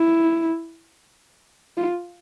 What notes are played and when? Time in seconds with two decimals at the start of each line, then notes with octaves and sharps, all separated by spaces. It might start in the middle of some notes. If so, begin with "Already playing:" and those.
Already playing: E4
1.77 F4